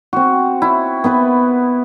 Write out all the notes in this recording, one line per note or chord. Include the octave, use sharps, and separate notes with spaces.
C4 F#4
E4
B3 E4 B4